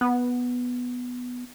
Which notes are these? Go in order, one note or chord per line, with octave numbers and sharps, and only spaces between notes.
B3